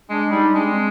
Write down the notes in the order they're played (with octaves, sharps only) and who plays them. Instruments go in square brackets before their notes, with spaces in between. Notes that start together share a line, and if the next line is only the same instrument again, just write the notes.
[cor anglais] G#3 [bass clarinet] D4
[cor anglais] G3 [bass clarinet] D#4
[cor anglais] G#3 [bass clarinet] D4
[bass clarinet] C4